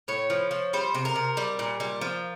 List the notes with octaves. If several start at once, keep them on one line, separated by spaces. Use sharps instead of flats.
A2 C#5
F3
F3
G3 C5
C3
A#4
C3
G3
A#2
G3
F3